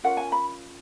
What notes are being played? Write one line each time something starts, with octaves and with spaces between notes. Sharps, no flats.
C#4 F4 A#4 F#5
G#5
B5